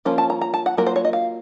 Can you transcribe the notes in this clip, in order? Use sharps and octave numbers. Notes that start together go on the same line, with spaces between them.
F3 A#3 C#4 F4 C5
A5
A#5
A#5
A5
F#5
F#3 A#3 F4 A#4
C5
C#5
D#5
F5